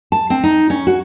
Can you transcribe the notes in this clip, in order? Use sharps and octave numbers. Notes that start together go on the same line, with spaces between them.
A5
C4
D#4
C#4
F#4